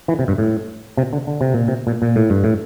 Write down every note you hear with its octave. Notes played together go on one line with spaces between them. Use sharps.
E3
C3
G2
A2
C3
D3
D3
C3
A#2
C3
A#2
A#2
A2
G2
A2